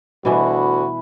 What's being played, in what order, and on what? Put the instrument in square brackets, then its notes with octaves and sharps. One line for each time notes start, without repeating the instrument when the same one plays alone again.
[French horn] D2 [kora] B2 E3 G3 [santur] E4 B4 G#5 [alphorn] F#4